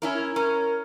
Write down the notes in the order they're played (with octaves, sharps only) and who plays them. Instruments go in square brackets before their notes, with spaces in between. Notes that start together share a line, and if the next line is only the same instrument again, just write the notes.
[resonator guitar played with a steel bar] C#4 E4 A#4
[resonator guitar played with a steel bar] C#4 [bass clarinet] A#4